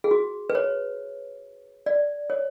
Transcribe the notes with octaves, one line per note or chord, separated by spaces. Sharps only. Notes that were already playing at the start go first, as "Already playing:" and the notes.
G#4
F#4
B4
C#5
D5
C#5